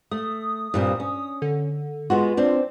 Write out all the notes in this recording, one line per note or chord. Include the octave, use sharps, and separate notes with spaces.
A3 D#6
G2 A#2 C4
C#4
D3
G#3 B3 F4 F#4
C4 D4